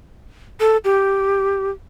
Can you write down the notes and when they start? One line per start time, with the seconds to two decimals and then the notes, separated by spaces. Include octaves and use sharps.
0.60 A4
0.84 G4